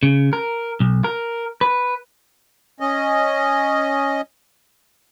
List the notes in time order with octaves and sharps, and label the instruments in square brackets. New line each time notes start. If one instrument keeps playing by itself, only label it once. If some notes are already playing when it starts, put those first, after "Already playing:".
[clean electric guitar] C#3
A#4
B1
A#4
B4
[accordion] C#4 D#5